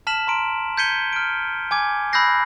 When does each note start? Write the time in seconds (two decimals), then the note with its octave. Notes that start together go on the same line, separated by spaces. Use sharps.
0.07 A5 F6 B6 E7 F#7
0.27 A#5 C6 D7
0.77 G6 G#6 B6 C#7 D#7 G7
1.13 F6 D7
1.71 G#5 D6 G#6
2.13 B5 E6 F#6 G6 A#6 C7